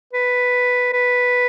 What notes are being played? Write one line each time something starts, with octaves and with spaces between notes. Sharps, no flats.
B4
B4